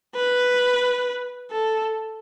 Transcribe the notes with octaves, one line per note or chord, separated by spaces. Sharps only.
B4
A4